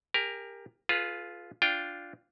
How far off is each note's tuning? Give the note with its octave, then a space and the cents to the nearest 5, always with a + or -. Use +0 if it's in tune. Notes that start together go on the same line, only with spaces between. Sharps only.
G4 +30 A#4 +0 G#5 +40
F4 +0 G#4 +45 B4 +0
D4 -5 F4 +0 G5 +0